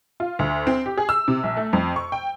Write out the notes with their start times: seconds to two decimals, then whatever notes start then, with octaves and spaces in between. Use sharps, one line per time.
0.20 F4
0.39 D2
0.67 C4
0.86 G4
0.97 G#4
1.09 E6
1.28 C3
1.43 A#1
1.57 A3
1.73 F2
1.96 C#6
2.12 G5